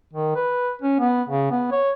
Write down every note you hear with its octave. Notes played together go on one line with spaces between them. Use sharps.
D#3
B4
C#4
B3
C#3
B3
C#5